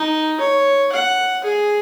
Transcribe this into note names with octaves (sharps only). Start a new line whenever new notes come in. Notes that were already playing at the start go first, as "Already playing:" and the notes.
Already playing: D#4
C#5
F#5
G#4